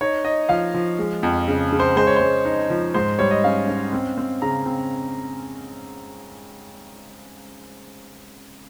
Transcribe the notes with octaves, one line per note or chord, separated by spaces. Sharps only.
D#4 C#5
D#4 D#5
F3 F5
F3
G#3
F2
C#3
C#3
C5
G#3 C5
C#5
G#3 C5
D#4
F3
G#2 C5
G3 C#5
D#5
C#4 F5
C#4
C4
C4
C#3 A#5
C4